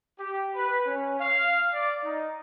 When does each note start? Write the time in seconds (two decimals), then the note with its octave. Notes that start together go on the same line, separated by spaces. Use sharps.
0.19 G4
0.55 B4
0.86 C#4
1.19 F5
1.74 D5
2.04 D#4